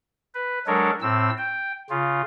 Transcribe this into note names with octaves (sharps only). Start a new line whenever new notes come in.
B4
F#3 G#3 D4 A4 A#4 C#5
A2 C4 E6
G5
C#3 F4